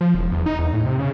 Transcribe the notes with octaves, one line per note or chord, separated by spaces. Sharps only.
F3
E1
E2
D#4
E2
A2
C3
C#3